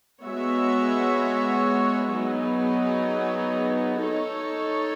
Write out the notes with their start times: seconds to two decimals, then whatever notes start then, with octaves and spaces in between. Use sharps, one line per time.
0.23 G#3 B3 F#4 C#5 E5
2.11 F#3 B3 D#4 G#4
4.00 D#4 A4 C#5